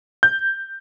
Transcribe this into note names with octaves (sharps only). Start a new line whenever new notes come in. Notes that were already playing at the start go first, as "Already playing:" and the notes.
G6